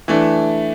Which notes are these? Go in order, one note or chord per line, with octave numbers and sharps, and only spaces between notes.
E3 A3 D4